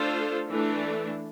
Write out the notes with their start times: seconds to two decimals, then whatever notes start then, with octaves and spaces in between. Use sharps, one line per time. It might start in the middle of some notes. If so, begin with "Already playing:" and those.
Already playing: A3 D4 F4 A4 C5
0.49 E3 A3 D4